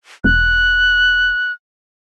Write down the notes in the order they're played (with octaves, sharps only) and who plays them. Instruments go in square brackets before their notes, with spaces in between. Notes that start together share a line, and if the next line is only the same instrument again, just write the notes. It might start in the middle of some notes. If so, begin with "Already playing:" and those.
[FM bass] E1 [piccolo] F#6